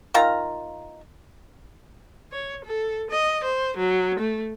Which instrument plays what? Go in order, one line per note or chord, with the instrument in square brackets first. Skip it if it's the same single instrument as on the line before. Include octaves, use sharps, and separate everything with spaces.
[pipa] D#3 F4 F5 A#5
[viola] C#5
A4
D#5
C5
F#3
A3